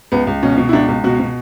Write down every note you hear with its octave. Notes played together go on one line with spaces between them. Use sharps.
C#2 B3
C#2
B2 C#4
B2
E4
C#2 D4
C#2
B2 F#4
B2